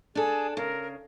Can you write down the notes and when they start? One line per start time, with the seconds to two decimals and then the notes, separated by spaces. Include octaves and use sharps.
0.15 D4 G#4 A4
0.57 C#3 A#4